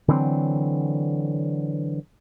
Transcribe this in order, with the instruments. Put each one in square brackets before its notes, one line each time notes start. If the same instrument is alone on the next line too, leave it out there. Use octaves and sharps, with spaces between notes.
[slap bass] D3 E3 F#3 C4